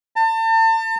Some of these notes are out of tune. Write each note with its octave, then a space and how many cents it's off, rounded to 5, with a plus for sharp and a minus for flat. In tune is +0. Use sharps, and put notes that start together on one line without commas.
A5 +40